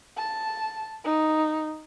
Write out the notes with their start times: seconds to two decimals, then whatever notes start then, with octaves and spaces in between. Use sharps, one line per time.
0.17 A5
1.05 D#4